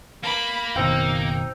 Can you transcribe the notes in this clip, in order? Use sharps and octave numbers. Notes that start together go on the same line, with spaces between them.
A#3 B5
F#1 B2 D#3 C4 D#4 G5